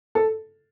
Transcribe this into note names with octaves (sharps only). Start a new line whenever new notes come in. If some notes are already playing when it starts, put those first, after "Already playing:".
A4